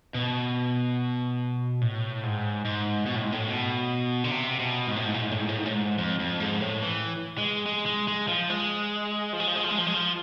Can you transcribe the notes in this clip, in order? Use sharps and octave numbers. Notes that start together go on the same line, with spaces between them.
B2
A2
G#2
G#2
B2
A2
G#2
A2
B2
D3
C3
B2
G#2
A2
G#2
A2
G#2
A2
G#2
A2
G#2
A2
G#2
F2
F2
G#2
A2
E3
G#3
G#3
G#3
G#3
F3
G#3
F3
G#3
F3
G#3
F3
G#3
F3
G#3
F3